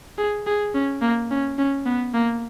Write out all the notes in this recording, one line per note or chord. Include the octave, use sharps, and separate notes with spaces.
G#4
G#4
C#4
A#3
C#4
C#4
B3
A#3